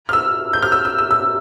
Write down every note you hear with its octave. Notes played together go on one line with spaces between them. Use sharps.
F6
E6
G6
F6
E6
E6
E6
E6